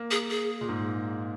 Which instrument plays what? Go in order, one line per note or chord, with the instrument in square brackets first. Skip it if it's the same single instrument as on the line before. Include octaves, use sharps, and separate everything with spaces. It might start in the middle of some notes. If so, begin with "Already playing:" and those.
Already playing: [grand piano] A#3
[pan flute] G#4
G#4
[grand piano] A#2
G#2